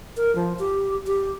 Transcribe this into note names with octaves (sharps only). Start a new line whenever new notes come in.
A#4
F3
G4
G4